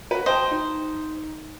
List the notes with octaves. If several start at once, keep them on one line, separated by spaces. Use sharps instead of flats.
F#4 B4
C5 D#5 G5 A5
D#4